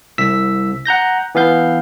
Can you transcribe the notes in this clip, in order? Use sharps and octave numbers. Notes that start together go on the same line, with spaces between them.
C2 E6 B6
F#5 A#5 G6 A#6
E3 B3 F5 G6